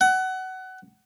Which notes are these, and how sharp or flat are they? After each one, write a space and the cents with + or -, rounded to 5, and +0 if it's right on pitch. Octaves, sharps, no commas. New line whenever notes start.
F#5 +20